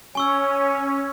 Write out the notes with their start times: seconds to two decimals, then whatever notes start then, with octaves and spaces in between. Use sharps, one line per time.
0.15 C#4 C#5 G#5 C#6 E6